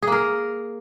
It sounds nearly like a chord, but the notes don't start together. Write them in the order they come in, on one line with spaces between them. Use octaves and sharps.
G#4 A#3 A#4